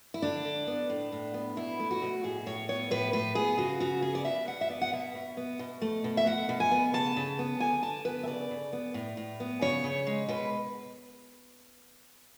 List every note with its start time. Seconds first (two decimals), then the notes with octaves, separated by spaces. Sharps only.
0.14 E4
0.22 D3 D4
0.45 D3
0.67 B3
0.90 A2
1.12 A2
1.34 B3
1.57 B2 E4
1.80 A3
1.91 F#4
2.02 B2
2.24 A2 G#4
2.46 A2 C#5
2.68 B3 C#5
2.91 A2 B4
3.13 A2 B4
3.35 B3 G#4
3.58 C#3 F#4
3.80 C#3 F#4
4.02 B3 G#4
4.15 D5
4.25 B2 E5
4.47 B2 F#5
4.61 E5
4.69 B3 D5
4.81 F#5
4.92 B2 E5
5.15 B2
5.37 B3
5.59 B2
5.82 A3
6.04 B2
6.17 E5
6.26 B2 F#5
6.49 B2
6.60 G#5
6.71 B3
6.93 C#3 A5
7.17 C#3
7.39 B3
7.60 D3 G#5
7.83 D3 A5
8.05 B3 B4
8.23 E5
8.27 C#3 D5
8.51 C#3
8.73 B3
8.94 A2
9.17 A2
9.40 B3
9.61 C#3 C#5
9.84 C#3
10.07 G#3
10.28 B2 B4